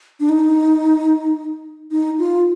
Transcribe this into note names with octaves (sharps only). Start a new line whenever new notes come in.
D4
D#4
D#4
F4